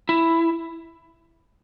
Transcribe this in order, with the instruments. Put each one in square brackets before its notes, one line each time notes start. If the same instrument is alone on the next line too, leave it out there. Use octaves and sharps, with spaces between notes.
[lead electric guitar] E4